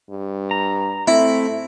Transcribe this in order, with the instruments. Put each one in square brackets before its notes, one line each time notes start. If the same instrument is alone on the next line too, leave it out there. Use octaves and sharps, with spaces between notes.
[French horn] G2
[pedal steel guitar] A#5
[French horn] A3 [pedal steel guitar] C4 [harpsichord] E4